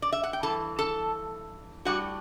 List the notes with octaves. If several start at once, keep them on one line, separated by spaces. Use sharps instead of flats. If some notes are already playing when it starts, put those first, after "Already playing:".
D5
E5
F#5
G5
G2 E3 A4 A5
A4 A5
A2 G3 D4 F#4 F#5